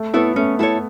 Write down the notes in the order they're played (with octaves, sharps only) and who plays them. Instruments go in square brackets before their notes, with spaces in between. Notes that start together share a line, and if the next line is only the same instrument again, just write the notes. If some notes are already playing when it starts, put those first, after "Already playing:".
Already playing: [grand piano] A3
[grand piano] B3 [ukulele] E4 A4 C#5
[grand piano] A3 [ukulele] C#4
[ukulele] E4 A4 C#5